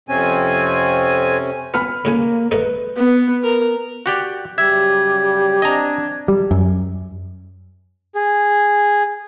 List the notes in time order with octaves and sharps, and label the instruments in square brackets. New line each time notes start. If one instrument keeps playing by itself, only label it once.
[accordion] F2 C4 G#5 [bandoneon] C3 C#4
[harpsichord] B3 [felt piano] B5 F6
[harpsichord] A2 C#3 G#5 [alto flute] A#3
[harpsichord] G#2 A3 D#4 [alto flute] B4
[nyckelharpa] B3
A#4
[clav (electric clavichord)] F#4 G4 D5
[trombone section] C#3 F#3 G3 [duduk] G4 [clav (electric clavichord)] E5 [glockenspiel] G#6
[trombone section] C4 D4 [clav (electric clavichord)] D#5 G#5 A#5
[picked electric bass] G3
F#2
[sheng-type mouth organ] G#4